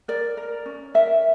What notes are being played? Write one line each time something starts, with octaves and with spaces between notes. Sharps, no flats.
A#4 D5
A#4
C#4
A#4 E5